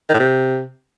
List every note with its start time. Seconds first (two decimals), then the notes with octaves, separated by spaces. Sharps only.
0.09 D#3
0.14 A2
0.19 C3